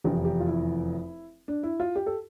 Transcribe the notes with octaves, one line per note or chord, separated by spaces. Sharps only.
F1 E2 E3 G4
G4
F4
E4
D4
E4
F4
G4
A4